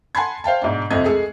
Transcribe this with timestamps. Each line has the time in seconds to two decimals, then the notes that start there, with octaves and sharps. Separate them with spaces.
0.15 F#5 G#5 A5 B5 C6 G#6
0.44 C5 F5 G5 A5
0.62 G#2 B2 D4
0.90 C2 F2 A3 C4 D#5 G#6
1.04 G#3 A3 G#4 A4